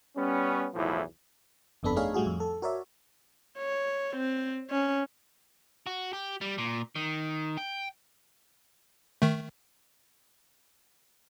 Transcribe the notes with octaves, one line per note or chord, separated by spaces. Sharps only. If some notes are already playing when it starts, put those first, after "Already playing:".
G3 B3 C#4
B1 E2 A2 F3 E4
G1 F2 B3 D4 A4 B5
A3 D4 D#4 G#4 C#5 F5
A2 G3 A3 F#4 G#4
F2
A4
F#4 A#4 C#5 D5 E5
C#5
C4
C#4
F#4
G4
G3
A#2
D#3
G5
D#3 A3